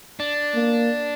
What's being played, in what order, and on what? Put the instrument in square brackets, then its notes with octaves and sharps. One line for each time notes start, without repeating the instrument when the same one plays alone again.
[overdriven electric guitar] D4
[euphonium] A#3